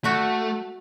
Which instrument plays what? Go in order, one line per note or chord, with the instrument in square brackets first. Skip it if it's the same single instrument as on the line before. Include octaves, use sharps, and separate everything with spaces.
[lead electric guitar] A3 [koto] F#4 E5